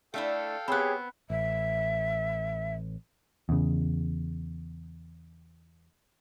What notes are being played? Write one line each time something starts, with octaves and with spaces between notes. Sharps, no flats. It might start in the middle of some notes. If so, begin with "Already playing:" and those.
A3 D4 E4 A4 F5 G5
B3 C4 G4 G#4 C#5 B5 F#6
A1 E5
E2 C#3